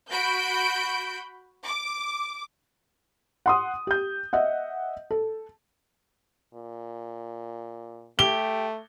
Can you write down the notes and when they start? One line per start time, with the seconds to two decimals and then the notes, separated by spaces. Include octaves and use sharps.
0.11 F#4 B5 G6 D7
1.66 D6
3.46 F#5 C6 D#6
3.87 G4 G6
4.33 D#5 E5 F#5
5.11 A4
6.54 A#2
8.19 A3 G4 G7